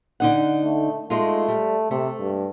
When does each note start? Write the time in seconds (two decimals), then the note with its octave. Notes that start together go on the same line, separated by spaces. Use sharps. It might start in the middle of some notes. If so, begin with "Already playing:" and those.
0.20 D3 D#4 F#5
0.64 A3
1.10 G#3 A3 D#4 F4
1.48 G3
1.91 C3 A3
2.20 G2